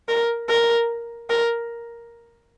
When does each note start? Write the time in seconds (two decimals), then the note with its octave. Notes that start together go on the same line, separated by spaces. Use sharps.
0.09 A#4
0.49 A#4
1.30 A#4